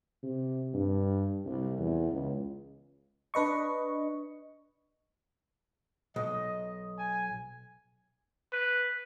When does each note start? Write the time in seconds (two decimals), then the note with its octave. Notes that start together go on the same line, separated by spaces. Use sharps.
0.23 C3
0.74 G2
1.46 C2
1.79 E2
2.12 C#2
3.34 D4 B4 D#5 C#6
6.16 B1 D#5
6.98 G#5
8.53 B4